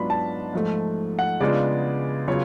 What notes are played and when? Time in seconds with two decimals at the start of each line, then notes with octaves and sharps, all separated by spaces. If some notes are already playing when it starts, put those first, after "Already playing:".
Already playing: G#2 F#3 B3 D4 F4 B5
0.10 A5
0.53 G#2 F3 A3
1.19 F#5
1.40 C#3 G#3 B3 D4 F4 D5
2.28 C#3 F#3 B3 F4 C#5